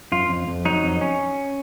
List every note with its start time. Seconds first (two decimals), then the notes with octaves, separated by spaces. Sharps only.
0.12 F#2 F4
0.29 F2
0.47 F2
0.65 F#3 D#4
0.84 F2
1.01 C#4